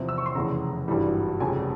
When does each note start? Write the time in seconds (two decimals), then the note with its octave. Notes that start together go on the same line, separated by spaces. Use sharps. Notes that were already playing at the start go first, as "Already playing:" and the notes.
Already playing: E2 C3 F3
0.09 E6
0.18 C#6
0.26 C6
0.35 F1 E2 C#3 A#5
0.88 G#1 G2 E3 G3
1.40 F1 F2 C#3 G3 G#5